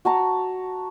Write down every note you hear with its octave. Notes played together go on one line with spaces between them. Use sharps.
F#4 A5 A#5